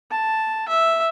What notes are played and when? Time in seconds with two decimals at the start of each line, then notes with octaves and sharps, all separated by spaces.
0.11 A5
0.68 E5